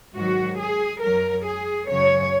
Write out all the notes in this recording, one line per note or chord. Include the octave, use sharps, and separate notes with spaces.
G#2 D#3 F#3 F#4
G#4
F#2 F#3 A#4
G#4
F#2 C#3 F#3 C#5